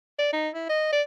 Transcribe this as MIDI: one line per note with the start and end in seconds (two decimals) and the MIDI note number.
0.19 0.29 74
0.32 0.49 63
0.54 0.68 64
0.69 0.87 75
0.92 1.02 74